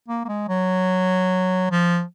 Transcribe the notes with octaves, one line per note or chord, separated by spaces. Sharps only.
A#3
A#3
G#3
F#3
F3